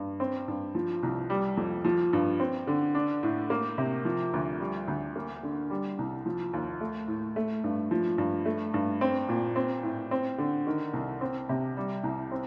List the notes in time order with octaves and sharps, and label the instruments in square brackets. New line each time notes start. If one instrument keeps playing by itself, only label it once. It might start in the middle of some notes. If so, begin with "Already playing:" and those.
Already playing: [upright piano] G2
C4
G2
F3
C2
G3
F2
F3
G2
C4
D3
D4
A2
A#3
C3
F3
D2
G3
D2
A#3
D3
G3
C2
F3
D#2
A3
A2
A3
G2
F3
G2
A3
G2
C4
A#2
C4
A2
C4
D3
D#3
C2
C4
C3
G3
C2
C4